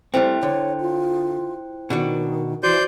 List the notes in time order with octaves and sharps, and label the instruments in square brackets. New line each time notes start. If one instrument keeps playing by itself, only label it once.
[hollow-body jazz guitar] G3 A3 C4 [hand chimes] E4 C5 G5
[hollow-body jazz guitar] D3 [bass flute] C#5
[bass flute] F4
[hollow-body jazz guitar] B2 D4 F#4 [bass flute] D#3
[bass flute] E3 [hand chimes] F#4 [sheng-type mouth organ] C5 D5 G6